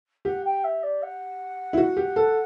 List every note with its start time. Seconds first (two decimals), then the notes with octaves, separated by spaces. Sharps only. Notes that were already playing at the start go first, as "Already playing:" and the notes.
0.25 G4 F#5
0.45 G5
0.63 E5
0.83 D5
1.02 F#5
1.73 E4
1.77 F#4
1.97 G4
2.16 A4